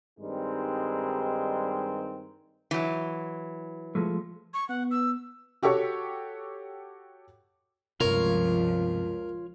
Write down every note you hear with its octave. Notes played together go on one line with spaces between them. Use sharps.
G2 D#3 G3 G#3 C4 D#4
E3 F#3
F3 G#3 A3
C#6
B3 F#5
E6
F#4 G4 A4 C#5 C#6
C#2 G2 C3 F3 F4 A#4 C#5 C#6